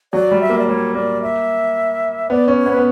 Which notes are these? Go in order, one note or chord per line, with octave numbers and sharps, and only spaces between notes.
F#3 D5
G3
E5
A#3
D5
G3 C#5
A#3 D5
E5
B3 D5
C#4
C#5
B3
B4
B3